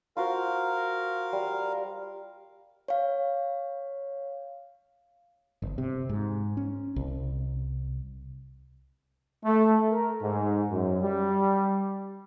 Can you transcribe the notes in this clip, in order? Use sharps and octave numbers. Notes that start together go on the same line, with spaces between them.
F4 F#4 A#4 C5 F5
G3
C#5 F5
G1
C3
G#2
C#4
C2
A3
A#4
G#2
F#2
G3